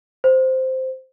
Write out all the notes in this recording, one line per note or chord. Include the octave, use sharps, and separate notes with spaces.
C5